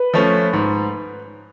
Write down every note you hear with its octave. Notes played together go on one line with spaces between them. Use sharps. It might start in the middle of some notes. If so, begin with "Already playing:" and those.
Already playing: B4
F3 A3 C#4
G#2